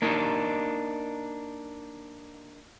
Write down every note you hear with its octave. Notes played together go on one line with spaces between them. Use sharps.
A#3 D4 D#4